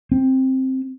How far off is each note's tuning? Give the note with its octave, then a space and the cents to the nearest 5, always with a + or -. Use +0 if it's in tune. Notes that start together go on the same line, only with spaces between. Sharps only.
C4 +5